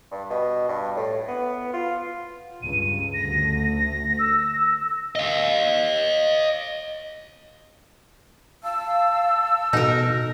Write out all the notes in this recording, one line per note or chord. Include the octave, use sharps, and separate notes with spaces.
G2
B2
G2
A2
B3
F4
C#2 G2 D#7
D2 A3 A#6
E6
D#5 F5
F5 A5 E6
B2 D#4 A4 A#4